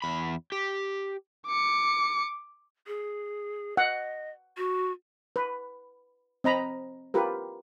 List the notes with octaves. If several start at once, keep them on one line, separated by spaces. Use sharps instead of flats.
E2 B5
G4
D6 C#7
G#4
D#5 F#5
F#4
B4
C4 D#5 A#5 B5
F4 G4 A#4 B4